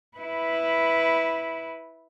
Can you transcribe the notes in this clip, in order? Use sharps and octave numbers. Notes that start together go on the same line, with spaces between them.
E4 B4